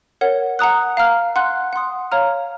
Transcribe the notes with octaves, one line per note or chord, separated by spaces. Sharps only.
A#4 C#5 F#5
F#5 A#5 D#6 F#6
F5 A#5 F6
F#5 C6 F#6
F#5 C6 D#6
C#5 F5 A#5 F6